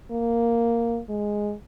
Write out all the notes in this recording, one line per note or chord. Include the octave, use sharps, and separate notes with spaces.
A#3
G#3